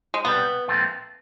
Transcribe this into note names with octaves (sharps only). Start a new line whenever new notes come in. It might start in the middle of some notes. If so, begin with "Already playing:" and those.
G#3
C2 B2 G3 B3
A#2 F3 A3 C4 F4